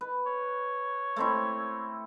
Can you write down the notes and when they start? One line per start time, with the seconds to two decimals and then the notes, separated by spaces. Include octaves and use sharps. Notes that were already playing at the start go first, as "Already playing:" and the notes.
0.01 B4
0.26 C#5
1.16 A3 C4 E4